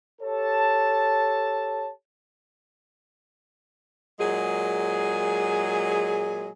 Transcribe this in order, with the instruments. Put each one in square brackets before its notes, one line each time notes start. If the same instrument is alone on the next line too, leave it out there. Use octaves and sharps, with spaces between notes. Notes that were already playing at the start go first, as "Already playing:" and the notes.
[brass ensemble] G4 A4 C#5 A5
[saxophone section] A#2 F#3 G#3 G#4